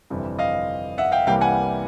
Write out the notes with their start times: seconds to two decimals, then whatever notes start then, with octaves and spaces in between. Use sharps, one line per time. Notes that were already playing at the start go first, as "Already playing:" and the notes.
0.10 G1 F2 C3 E3 G3
0.39 D#5 F5
0.98 E5 F#5
1.12 F5 G5
1.27 C2 C3 E3 G3 A#3 F5 G5
1.41 F#5 G#5